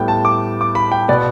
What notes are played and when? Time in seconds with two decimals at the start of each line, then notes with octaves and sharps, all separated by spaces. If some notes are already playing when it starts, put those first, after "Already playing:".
Already playing: A2 G3 B3 G5
0.08 A5
0.25 D6
0.61 D6
0.75 B5
0.92 G5
1.08 B2 B3 D5